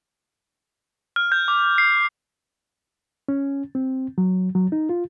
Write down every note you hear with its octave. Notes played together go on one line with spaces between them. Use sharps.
F6
G6
D6
C7
C#4
C4
F#3
F#3
D#4
F4